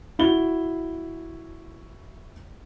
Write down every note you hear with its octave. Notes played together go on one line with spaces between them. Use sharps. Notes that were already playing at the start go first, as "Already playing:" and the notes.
E4 F#4 G7